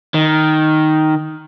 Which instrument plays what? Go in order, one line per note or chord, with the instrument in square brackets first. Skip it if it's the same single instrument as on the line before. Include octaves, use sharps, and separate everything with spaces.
[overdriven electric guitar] D#3